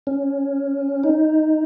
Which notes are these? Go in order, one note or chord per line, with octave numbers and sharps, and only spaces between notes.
C#4
D#4